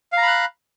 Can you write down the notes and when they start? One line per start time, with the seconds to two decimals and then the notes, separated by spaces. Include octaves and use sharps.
0.12 F5
0.17 A#5
0.22 B5
0.27 F#6